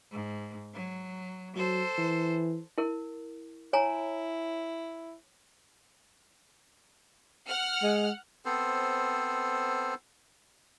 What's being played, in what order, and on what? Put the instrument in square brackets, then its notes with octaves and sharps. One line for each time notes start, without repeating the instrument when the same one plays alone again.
[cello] G#2
F#3
[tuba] F#3 [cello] A4 C5
[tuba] E3
[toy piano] E4 A#4
[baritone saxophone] E4 [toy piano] C#5 G#5 A#5
[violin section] F#5 F6
[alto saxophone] G#3
[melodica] B3 C4 A4 C5